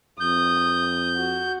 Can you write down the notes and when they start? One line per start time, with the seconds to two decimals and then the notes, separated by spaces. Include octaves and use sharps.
0.20 F2 D#6 G6
1.16 F#4